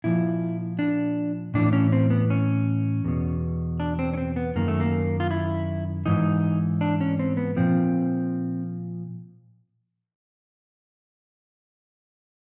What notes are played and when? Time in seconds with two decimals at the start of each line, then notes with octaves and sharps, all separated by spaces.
0.04 A#2 F3 E4
0.79 D4
1.54 A2 E3 D4
1.73 C#4
1.92 C4
2.10 B3
2.30 C#4
3.05 E2 B2
3.80 D4
3.99 C4
4.14 C#4
4.17 C4
4.36 B3
4.56 F#2 D#3 A#3
4.68 A3
4.80 A#3
5.20 F4
5.31 E4
6.06 G#2 E3 D#4
6.81 D4
7.01 C#4
7.19 C4
7.37 B3
7.56 A#2 F3 C4